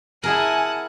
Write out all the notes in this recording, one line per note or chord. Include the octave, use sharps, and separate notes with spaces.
E4 G#4 A#4 F#5 G#5 A5